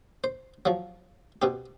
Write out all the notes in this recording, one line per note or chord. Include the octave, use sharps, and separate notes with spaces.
C5
F3 F#3
B2 C4 G4